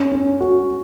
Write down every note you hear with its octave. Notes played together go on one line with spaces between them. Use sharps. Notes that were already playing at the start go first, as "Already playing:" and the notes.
Already playing: C#4
C#4
F#4